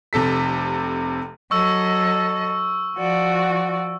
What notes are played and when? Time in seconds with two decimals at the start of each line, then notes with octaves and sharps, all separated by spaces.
0.13 F1 C3 A4 B6
1.51 F#3 A4 D#5 C#6 E6
2.96 F3 F#4 D5